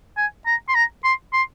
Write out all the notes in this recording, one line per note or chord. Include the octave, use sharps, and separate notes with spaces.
G#5
A#5
C6
A#5
C6
C6